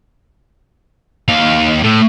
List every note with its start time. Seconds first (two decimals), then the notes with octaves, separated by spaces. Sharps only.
1.29 D#2 F5
1.84 A2